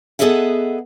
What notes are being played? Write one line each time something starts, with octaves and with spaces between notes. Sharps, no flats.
B3 G#4 A4 D#5 E5 F#5